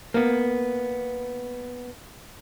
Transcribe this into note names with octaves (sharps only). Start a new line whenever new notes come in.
A#3 B3